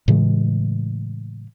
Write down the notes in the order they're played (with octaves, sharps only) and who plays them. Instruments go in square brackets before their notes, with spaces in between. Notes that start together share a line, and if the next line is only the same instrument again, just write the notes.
[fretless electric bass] A2 C#3 E3 G#3